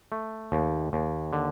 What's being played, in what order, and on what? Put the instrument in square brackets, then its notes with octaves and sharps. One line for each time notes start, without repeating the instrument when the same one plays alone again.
[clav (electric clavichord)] A3
D#2
D#2
D3